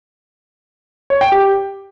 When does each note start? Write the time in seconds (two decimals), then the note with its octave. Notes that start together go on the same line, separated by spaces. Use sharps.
1.10 C#5
1.21 G5
1.32 G4